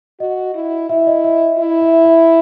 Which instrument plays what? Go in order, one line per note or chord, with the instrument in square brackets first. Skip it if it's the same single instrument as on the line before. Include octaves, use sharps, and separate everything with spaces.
[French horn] F#4 [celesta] D#5
[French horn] E4
[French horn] E4 [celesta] E5
[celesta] D#5
E5
[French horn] E4
[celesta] E5
E5